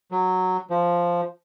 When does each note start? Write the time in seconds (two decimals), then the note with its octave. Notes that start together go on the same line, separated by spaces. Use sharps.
0.12 F#3
0.70 F3